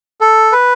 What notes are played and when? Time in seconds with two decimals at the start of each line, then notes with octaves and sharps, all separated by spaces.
0.21 A4
0.52 B4